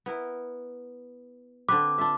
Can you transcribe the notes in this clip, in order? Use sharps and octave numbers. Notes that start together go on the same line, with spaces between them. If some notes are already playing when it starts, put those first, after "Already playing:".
B3 E4 A#4
D3 C4 B4 D6
D4 F4 E5